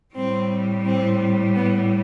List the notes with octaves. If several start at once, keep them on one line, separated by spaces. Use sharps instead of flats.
A2 G3 C4
C4
B3